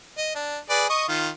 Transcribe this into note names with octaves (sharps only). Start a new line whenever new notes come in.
D#5
D4
G#4 B4 D5
D#5 C#6 D#6
D#3 F4